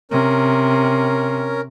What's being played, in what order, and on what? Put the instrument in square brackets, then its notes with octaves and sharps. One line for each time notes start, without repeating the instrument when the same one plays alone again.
[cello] C3 [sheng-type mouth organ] C#4 A#4